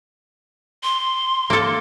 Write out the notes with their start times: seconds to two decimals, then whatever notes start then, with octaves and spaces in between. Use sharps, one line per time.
0.83 C6
1.50 A#3 A4